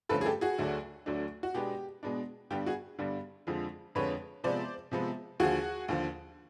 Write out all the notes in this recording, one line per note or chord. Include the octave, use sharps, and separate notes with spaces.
G2 D3 F3 A3 C#4 A4 B4
G#4
G4 A4
F#4 G#4
D2 D3 F#3 A3 D4
D2 D3 F#3 A3 D4
F#4
B2 G#3 B3 D4 G4
B2 G#3 B3 D4
G2 D3 G3 B3 D4 G4
F#4 G#4
G2 D3 G3 B3 D4
F2 D3 F3 G#3
F2 D3 F3 G#3 B4 C#5
C3 F3 G#3 B3 C5 D5
C3 F3 G#3 B3
D#2 D3 F3 F#4 G#4
D#2 D3 F3